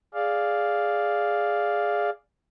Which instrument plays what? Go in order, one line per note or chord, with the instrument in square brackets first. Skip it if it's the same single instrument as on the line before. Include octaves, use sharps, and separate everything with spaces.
[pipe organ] G#4 D5 F5